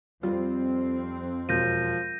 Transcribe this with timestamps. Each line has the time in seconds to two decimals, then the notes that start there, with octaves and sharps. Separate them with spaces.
0.23 F2 G3 C4 F4
1.49 E1 F3 G6 A#6 D#7